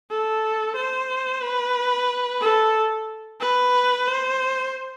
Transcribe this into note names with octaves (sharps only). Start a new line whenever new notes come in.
A4
C5
B4
A4
B4
C5